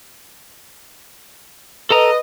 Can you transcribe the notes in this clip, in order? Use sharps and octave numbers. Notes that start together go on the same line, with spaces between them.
A4 B4 D#5 A#5